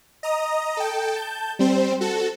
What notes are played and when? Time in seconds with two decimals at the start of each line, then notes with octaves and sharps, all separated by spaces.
0.23 D#5 A#5 D#6
0.77 A4 G5
1.16 A5 G6
1.59 G3 C4 C5
2.01 F#4 A4